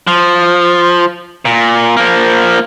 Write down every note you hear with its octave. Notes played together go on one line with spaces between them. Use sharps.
F3
A#2
F3 A#3